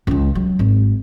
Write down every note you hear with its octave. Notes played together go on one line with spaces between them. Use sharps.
C#2 G#3
F#3
G#1